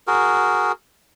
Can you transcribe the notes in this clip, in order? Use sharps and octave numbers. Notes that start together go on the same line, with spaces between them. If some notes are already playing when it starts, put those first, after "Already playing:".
F#4 G#4 A#4